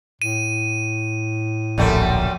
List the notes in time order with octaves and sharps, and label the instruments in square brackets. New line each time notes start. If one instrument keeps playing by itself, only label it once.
[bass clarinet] A2 [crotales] D#7
[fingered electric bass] D1 A#1 [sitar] F#2 G3 A3